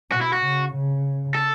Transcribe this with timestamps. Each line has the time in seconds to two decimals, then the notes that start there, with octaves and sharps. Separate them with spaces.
0.11 B2 F#4
0.21 E4
0.33 F#4
0.42 C#3
0.73 C#3
1.35 A4